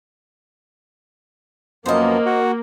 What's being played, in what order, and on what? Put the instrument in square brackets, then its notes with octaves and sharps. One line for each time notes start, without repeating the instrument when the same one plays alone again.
[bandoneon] F#2 F3 B3 [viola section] A#3 [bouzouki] C5 D#5
[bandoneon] F#4